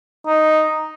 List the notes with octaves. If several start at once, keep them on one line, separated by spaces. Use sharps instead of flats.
D#4